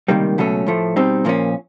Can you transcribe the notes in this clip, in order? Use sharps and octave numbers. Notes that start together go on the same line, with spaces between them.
C#2 C3 D#3 G3 A#3
C#2 B2 F#3 A3 C#4
A2 F3 A3
B2 G3 C4 D#4
A#2 F3 A#3 C#4